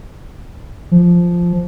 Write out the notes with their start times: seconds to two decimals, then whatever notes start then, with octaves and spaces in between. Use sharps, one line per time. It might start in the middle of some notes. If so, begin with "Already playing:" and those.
0.91 F3